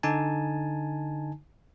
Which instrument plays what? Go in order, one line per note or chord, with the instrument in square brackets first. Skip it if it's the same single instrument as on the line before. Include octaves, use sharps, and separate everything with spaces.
[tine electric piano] D3 D#4 G#5 A5